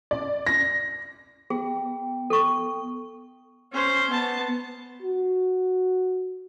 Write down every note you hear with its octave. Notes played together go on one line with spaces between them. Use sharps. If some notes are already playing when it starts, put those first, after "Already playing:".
D5
A#6
B3 G#4 G5
A4 C#6
C#4 C5
B3 A5
F#4